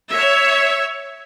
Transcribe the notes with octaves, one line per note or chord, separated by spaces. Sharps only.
C#5 E5